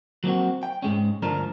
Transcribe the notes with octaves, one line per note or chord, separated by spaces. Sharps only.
F#3 A#3 C4 F#4
G5
G#2 G#3 C#4
D2 G2 F3 D4 A#4